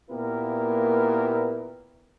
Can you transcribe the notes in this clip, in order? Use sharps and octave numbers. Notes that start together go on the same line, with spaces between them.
A#2 A#3 B3 E4 G4 A#4